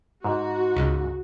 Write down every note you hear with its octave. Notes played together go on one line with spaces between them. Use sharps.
G#2 F#4
C#2